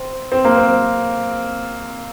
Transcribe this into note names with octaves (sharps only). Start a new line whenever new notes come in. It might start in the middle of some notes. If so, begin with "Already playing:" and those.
Already playing: C4
C4
A#3
C4